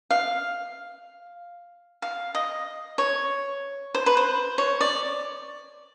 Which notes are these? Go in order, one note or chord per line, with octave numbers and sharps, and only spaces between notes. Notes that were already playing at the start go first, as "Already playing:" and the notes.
F5
F5
D#5
C#5
C5
B4
C5
C#5
D5